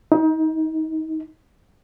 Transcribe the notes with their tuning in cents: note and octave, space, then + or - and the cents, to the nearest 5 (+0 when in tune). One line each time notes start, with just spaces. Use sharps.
D#4 +30